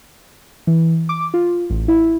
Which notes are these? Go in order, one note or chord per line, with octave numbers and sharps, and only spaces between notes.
E3
D6
F4
A1
E4